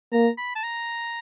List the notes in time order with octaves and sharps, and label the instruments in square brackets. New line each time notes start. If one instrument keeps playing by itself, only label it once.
[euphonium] A#3 [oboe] A#5
[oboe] B5
A5
A#5